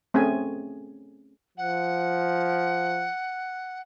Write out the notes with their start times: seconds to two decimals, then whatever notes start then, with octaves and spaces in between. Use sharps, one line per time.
0.14 A3 C4 C#4 G#4 G#5
1.58 F3 F#5